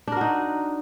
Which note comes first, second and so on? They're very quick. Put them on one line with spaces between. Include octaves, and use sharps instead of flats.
D4 A#4 F#4 D#4